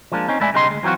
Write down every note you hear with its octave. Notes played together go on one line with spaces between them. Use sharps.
F3 G#3 A#3 D4
C4 C#4 D#4
A2 G#3 E4 D5 G#5
B1 C#3 G3 D#4 D#5 C6
D2 G#3
E3 F#3 C4 F4 F#4